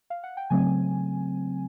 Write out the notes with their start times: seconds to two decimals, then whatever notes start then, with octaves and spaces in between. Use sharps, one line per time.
0.10 F5
0.23 F#5
0.37 G5
0.50 C#3 F#3 A3 C4 G#5